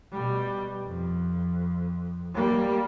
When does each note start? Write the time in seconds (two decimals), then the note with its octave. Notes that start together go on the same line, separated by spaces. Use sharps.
0.13 B2 G3
0.87 F2
2.34 G3 A#3